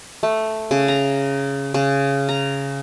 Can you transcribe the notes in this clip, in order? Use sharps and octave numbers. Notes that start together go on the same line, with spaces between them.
A3
C#3
A#5
C#3
A#5